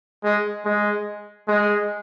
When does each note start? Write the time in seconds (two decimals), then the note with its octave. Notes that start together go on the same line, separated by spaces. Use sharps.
0.24 G#3
0.66 G#3
1.48 G#3